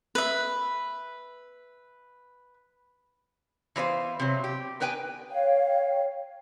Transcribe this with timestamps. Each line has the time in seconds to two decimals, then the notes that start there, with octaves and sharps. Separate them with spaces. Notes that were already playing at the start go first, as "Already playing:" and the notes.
0.15 B4 E5
3.76 E3 B3 C5 F5
4.20 C3 F#3
4.44 G4
4.80 B3 A#4 B4 G5 G#5
5.30 C#5 F5 G5